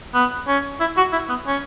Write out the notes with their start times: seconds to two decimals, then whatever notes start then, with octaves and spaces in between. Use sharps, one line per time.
0.14 B3
0.48 C#4
0.80 E4
0.97 F#4
1.12 E4
1.29 B3
1.46 C#4